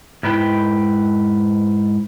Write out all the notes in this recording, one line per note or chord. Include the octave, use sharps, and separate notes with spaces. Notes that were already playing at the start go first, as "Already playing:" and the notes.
G#2 G#3 E4 B4 G5